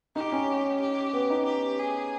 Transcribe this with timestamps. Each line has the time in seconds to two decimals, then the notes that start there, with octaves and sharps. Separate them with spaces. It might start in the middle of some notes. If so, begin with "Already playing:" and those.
0.16 D#4 G4
0.32 C#4
0.81 G4
1.13 B3
1.30 D#4
1.45 G4
1.79 G#4